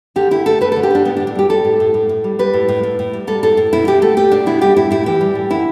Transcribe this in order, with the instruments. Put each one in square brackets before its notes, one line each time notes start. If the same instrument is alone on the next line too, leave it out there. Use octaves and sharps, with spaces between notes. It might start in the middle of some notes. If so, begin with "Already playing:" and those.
[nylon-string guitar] D3 G4
D3 E4
A3 A4
A3 B4
D3 A4
G4
D3 D4
A2 B3
D4
A2
D4
G3 G4
G3 A4
A2
A2
A2
A2
G3
G3 B4
A2
A2
A2
A2
G3
G3 A4
A2 A4
A2
B2 E4
B2 G4
A3 A4
A3 G4
B2 D4
B2 E4
G3 G4
A2 E4
A2 E4
E3 G4
G3
A2
D3 E4